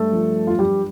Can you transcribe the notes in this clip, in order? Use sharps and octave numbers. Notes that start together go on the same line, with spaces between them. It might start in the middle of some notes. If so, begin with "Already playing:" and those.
Already playing: G2 A3 A4
F3
F4
G2 G3 G4